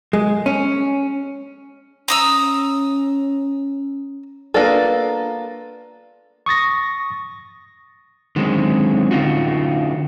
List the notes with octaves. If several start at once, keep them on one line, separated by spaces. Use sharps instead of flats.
G#3
C#4
C#4 A#5 D#6 E6
A#3 B3 D4 F4 A4
C#6 D#6 A6 A#6
D3 D#3 F#3 G#3 C4 C#4
D3 C#4 D#4 F4 F#4